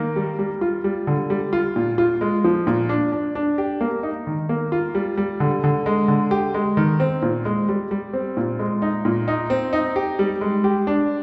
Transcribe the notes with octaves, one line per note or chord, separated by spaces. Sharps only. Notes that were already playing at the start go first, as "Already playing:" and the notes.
Already playing: D#3 A#3
G3
G3
F4
G3
D3
G3
F4
A#2
F4
G#3
F3
A#2
D4
D4
D4
G4
A#3
D#4
D#3
A#3
F4
G3
G3
D3
D3
G#3
D3
G4
G#3
D#3
C4
A#2
G#3
G3
G3
C4
A#2
G#3
D#4
A#2
D#4
C4
D#4
G4
G3
G#3
G4
D4